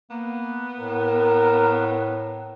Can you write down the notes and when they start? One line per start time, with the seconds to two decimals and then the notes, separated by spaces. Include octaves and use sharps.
0.10 A#3 B3
0.80 A2 A#4